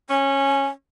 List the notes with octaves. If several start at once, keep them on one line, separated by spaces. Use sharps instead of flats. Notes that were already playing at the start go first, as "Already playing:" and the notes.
C#4 G#5